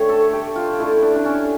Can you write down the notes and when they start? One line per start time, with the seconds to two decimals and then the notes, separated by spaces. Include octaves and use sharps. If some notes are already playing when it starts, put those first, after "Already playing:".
Already playing: D3 A3 G4 C#5
0.09 A4
0.33 G4
0.56 F4
0.78 D3 A3 E4
1.02 D4
1.16 D4
1.25 C#4